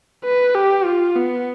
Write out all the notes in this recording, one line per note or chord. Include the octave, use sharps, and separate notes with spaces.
B4
G4
F4
B3